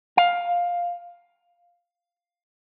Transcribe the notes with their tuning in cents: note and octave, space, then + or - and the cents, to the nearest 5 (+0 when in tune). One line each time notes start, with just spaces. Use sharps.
F5 +10